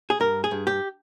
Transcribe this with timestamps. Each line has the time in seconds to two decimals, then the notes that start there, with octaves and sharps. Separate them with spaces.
0.10 G#4
0.20 G2 A#4
0.44 G#4
0.51 G2
0.67 G4